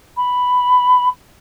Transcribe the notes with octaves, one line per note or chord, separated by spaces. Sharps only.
B5